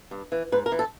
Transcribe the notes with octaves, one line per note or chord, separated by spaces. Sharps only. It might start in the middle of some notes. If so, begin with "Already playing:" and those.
G2
E3
G#2 B4
A#4
E3
A4